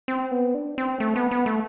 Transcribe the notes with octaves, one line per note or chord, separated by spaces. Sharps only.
C4
B3
D4
C4
A3
B3
B3
A3